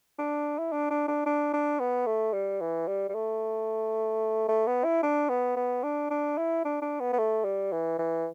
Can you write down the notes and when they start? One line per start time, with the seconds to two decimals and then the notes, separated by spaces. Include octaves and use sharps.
0.18 D4
0.58 E4
0.72 D4
0.90 D4
1.08 D4
1.26 D4
1.53 D4
1.80 B3
2.06 A3
2.33 G3
2.61 E3
2.87 G3
3.09 G3
3.15 A3
4.48 A3
4.67 B3
4.84 E4
5.03 D4
5.29 B3
5.56 B3
5.83 D4
6.10 D4
6.38 E4
6.65 D4
6.82 D4
7.00 B3
7.13 B3
7.18 A3
7.44 G3
7.72 E3
7.98 E3